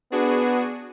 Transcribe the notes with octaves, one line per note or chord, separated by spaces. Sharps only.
B3 D4 F#4 G#4